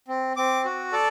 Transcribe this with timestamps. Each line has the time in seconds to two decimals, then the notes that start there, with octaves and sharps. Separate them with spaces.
0.08 C4
0.37 C4 D6
0.65 F#4
0.92 A4 D5